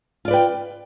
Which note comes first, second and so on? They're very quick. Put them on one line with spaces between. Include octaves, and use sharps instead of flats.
F4 D5 B4 G5